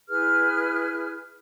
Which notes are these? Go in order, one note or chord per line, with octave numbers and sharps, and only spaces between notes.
E4 G#4 B4 F6